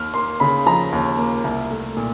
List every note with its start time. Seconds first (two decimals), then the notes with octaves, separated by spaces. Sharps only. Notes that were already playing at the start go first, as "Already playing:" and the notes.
Already playing: D#2 F6
0.14 A#3 C6
0.40 C#3 B5
0.66 F3 A#5
0.92 D#2
1.18 A#3
1.44 C2
1.71 A3
1.96 A#2